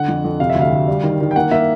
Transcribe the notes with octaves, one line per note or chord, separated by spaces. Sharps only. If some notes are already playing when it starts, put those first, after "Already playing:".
Already playing: D3 F#5
F2
F2
C3 F5
E5
D2
F5
D2
G3
D#3
D#3
G5
A#3 F#5
A#3 E5